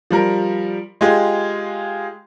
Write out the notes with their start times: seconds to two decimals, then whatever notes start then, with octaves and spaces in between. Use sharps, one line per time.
0.11 F3 G3 A#4
1.01 G#3 F4 G4 G#4